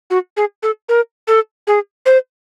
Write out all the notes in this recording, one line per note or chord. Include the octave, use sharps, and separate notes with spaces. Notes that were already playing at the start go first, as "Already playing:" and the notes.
F#4
G#4
A4
A#4
A4
G#4
C5